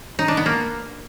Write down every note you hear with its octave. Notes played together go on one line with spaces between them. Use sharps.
D#4
D4
B3
A#3